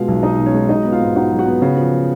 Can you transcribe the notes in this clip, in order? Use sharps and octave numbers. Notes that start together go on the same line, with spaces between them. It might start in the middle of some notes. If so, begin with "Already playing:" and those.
Already playing: B2 G#3 F4 F5
B1
D#4 D#5
B2
C#4 C#5
G#3
F#3 D#4 D#5
B3
F4 F5
G#2
D#4 F#4 F#5
F#3
F#4 F#5
B3
C#3
F3